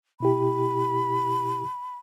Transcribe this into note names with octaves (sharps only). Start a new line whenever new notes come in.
B2 E4 G4 B5